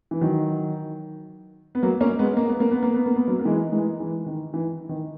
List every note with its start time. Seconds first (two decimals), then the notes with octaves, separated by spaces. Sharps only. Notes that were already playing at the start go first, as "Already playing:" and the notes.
0.11 E3
0.21 D#3 F#3
1.75 B3
1.83 F#3 A#3
2.01 A#3 C#4
2.19 G#3 B3
2.37 A#3
2.49 B3
2.60 A#3
2.71 B3
2.83 A#3
2.95 B3
3.06 A#3
3.16 B3
3.28 F#3 A#3
3.40 A#3
3.45 E3 G#3
3.72 E3 G#3
4.00 E3
4.26 D#3
4.54 E3
4.89 D#3